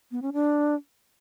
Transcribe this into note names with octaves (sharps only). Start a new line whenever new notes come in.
B3
C#4
D4